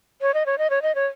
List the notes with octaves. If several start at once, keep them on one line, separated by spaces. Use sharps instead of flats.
C#5
D#5
C#5
D#5
C#5
D#5
C#5